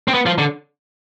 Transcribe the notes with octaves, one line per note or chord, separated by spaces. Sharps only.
C4
B3
F3
D3